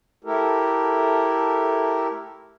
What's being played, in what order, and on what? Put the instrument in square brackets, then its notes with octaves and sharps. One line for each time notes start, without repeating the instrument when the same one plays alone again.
[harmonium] A3 E4 G4 A4 A#4